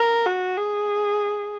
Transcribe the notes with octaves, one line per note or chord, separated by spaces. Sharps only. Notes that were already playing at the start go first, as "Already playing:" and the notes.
Already playing: A#4
F#4
G#4